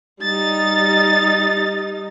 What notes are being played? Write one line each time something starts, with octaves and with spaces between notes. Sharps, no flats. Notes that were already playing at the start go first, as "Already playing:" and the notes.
G3 D#4 A6